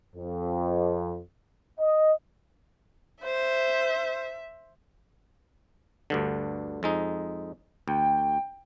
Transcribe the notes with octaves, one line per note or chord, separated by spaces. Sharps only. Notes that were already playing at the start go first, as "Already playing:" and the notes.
F2
D#5
C5 E5
D2 G2 D3
F2 G#3 D#4
D2 G5